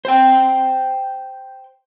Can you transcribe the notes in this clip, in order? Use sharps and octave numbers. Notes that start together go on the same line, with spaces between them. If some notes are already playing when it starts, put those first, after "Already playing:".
C5 G5